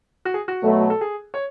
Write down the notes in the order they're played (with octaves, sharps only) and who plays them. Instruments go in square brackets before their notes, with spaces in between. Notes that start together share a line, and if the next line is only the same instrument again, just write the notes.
[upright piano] F#4
G#4
F#4
[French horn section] B2 F#3 A3
[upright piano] A4
G#4
C#5